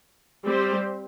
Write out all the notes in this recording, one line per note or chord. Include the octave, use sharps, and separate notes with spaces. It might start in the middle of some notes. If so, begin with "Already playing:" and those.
G3 C4 G4 C5